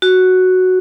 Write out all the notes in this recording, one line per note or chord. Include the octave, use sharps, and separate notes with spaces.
F#4